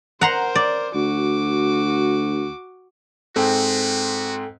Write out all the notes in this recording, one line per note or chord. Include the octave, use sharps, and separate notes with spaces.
A#4 C5 F#5 A#5 C6
D5
D2 F#4 D6
G#2 C4 F#4 G#4 A4 G5